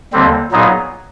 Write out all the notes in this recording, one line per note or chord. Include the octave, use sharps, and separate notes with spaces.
D#2 D3 G3 C4
A#2 F#3 B3 D#4 G#4